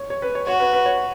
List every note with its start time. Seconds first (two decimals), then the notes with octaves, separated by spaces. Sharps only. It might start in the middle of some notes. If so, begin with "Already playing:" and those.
Already playing: C#5
0.10 C#5
0.22 B4
0.35 C#5
0.47 F#4 C#5
0.60 B4
0.73 B4
0.86 C#5